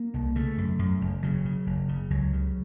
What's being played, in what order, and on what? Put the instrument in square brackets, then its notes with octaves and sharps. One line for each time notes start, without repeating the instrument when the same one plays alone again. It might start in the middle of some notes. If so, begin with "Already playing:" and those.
Already playing: [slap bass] A#3
C2
C#3 A3
F#2
F#2
F#1
C#3 F#3
C#3
F#1
C#3
C#2 F#3
C#3